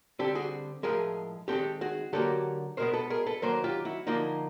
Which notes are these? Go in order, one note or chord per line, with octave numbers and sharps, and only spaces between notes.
D3 G3 C4 G4 A4
F#4 G#4
A2 F3 G#3 G#4 A#4
D#3 G#3 C4 G4 A4
F#4 G#4
D3 F#3 A#3 G4 A4
B2 G#3 B3 A#4 C5
A4 B4
G#4 A#4
A4 B4
D#3 F#3 A#3 A#4 C5
F4 G4
E4 F#4
D3 F3 A#3 D#4 F4